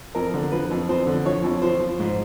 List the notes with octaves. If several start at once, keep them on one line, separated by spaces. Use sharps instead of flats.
F2 A#4
D3
F3 B4
F2
F2 C5
D3
F3 C#5
F2
F3 C5
F3
G#2